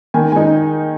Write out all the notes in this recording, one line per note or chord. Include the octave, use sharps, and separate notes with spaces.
D#3 G#5
G#3 D#4 G#5